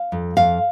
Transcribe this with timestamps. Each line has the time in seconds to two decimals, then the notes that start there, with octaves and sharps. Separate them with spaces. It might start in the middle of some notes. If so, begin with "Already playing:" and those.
Already playing: F5
0.12 F2
0.37 F2 F5